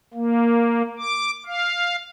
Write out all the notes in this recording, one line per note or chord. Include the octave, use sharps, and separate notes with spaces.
A#3
D6
F5